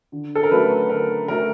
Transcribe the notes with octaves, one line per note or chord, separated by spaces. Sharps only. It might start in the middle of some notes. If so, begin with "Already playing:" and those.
D3
A4
A#4
F#3 A3 B4
D3 A#4
F#3 A3 A#4